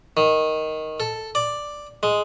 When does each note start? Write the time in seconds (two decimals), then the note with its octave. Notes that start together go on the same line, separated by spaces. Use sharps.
0.17 D#3
1.00 A4
1.35 D5
2.03 G#3